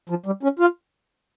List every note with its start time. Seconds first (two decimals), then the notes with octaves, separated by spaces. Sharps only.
0.10 F3
0.26 G3
0.43 C#4
0.59 F4